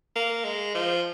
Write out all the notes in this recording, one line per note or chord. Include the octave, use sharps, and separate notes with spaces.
A#3
G#3
F3